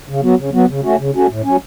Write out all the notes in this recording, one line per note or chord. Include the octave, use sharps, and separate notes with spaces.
C#3
F#3 B3 F#4
C#3
F#3 B3 F#4
C#3
A3 C#4 F#4
C#3
A3 C#4 F#4
A2
F#3 C#4